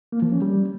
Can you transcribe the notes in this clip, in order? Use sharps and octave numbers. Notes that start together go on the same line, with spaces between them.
A#3
F3
C#4
G3